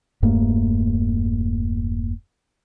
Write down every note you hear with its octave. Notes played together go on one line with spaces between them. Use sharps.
E1 G2 A3 A#3